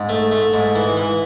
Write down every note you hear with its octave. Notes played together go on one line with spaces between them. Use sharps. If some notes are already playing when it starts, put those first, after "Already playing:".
Already playing: G#2
A3
A3
G#2
E3
E3